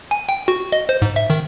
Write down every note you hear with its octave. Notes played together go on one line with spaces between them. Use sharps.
G#5
G5
F#4
D#5
C5
G#2
E5
D#3